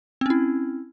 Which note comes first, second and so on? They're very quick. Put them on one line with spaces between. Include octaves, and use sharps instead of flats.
C4 C#4 E4